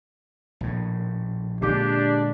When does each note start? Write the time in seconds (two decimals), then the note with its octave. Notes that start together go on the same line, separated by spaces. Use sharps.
0.61 A#1 A2
1.62 A#2 D3 G#3 D4 G4